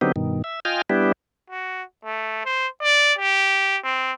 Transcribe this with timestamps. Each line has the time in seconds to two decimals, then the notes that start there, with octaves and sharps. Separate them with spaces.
0.01 D3 F#3 B3 C4 D#4 G4
0.16 G2 B2 D#3
0.44 E5
0.65 F4 D#5 G5 G#5 F6
0.90 G3 B3 D4 E4 G4
1.50 F#4
2.04 A3
2.45 C5
2.82 D5
3.19 G4
3.83 C4